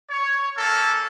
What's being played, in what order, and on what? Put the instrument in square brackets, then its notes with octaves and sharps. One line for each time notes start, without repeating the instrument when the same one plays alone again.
[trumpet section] C#5
A#3 C#4 A4